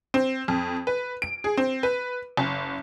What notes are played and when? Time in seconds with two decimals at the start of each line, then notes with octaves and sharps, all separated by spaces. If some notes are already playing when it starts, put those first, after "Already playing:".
0.14 C4
0.48 F2
0.87 B4
1.22 D7
1.44 G#4
1.57 C4
1.83 B4
2.37 F#1